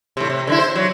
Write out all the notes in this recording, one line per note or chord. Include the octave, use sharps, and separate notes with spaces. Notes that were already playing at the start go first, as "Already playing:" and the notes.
A2 C3
C3
D3 A#3 E4
C5
F#3